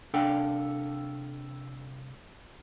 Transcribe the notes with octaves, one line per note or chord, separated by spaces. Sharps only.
C2 D4 A4 F5 G5